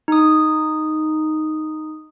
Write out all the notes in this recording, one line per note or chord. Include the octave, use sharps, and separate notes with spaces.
D#4 D#6